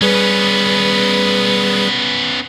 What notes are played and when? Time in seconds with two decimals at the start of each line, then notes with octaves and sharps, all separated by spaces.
0.01 G3 B3 C#4 G#4 B4